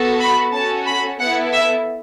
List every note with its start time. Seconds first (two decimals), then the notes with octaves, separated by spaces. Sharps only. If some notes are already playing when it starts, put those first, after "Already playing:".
Already playing: B3 F#4 A4
0.20 B5
0.53 C#4 F#4 A4 A5
0.86 B5
1.19 B3 E4 A4 F#5
1.52 E5